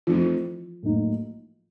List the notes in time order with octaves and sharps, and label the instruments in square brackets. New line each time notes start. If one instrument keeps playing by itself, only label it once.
[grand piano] E3 A3 C4 D#4 [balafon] F3 F4
[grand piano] A2 F#3 A#3 D#4